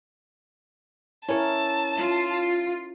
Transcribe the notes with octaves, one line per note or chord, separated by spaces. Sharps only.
C#4 E4 A#4 C#5 A5
F4